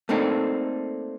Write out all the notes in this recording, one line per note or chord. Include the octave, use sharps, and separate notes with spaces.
A3 A#3 C4 D4 D#4 A4